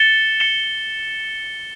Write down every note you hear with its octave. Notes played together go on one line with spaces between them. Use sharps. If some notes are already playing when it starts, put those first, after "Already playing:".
Already playing: A6 C#7 E7 G7
A6 C#7 E7 G7